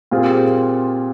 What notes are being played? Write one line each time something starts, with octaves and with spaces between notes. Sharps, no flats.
A#2 G3 C4 F4 G#4